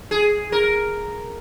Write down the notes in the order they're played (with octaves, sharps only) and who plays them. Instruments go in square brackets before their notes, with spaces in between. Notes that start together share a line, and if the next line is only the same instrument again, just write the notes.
[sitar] G#4
A#4